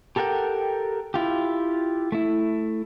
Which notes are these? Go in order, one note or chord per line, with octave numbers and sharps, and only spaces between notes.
G4 A4 A#4 F#5 G5
E4 F4 G4
A3 E4